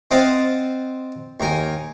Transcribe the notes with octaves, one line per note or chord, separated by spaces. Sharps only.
C4 D#5 F5 F#5 A5
D#2 A#4 G#5